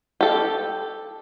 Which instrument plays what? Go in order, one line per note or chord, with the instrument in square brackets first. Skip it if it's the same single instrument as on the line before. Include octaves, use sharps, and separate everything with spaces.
[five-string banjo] G4 A4